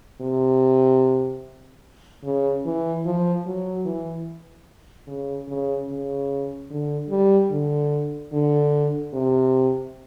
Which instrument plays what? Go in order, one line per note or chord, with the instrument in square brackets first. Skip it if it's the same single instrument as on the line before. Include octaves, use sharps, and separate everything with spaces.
[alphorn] C3
C#3
E3
F3
F#3
E3
C#3
C#3
C#3
D3
G3
D3
D3
C3